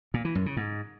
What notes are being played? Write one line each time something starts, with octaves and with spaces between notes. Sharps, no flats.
A#2
E3
F#2
C#3
G#2